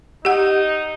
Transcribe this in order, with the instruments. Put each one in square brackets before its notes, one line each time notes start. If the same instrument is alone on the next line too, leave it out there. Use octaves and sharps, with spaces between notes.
[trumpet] D#4 [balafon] G4 F#5